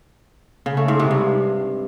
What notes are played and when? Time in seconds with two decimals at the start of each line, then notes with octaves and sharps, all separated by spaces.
0.66 C#3
0.77 A3
0.88 G#2
0.99 C3
1.11 G2